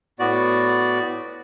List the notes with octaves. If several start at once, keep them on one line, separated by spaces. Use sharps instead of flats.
A2 B3 F#4 D5